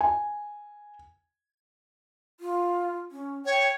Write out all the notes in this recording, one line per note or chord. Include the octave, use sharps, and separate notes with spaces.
G#5
F4
C#4
C#5 G5